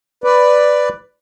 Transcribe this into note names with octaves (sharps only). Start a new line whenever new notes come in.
B4 D5